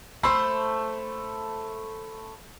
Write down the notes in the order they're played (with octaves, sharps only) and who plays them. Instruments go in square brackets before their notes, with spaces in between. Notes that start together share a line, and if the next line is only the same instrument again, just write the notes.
[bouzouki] A3 C5 [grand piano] B5 E6 C7